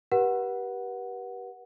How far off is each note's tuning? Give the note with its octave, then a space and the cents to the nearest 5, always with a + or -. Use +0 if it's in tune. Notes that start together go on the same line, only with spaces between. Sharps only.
G4 -20 B4 -35 F#5 +0